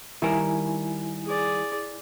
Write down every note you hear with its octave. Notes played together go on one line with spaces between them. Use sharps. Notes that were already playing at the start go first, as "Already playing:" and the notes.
D#3 G3 E4 A#4 G#5
G#4 D5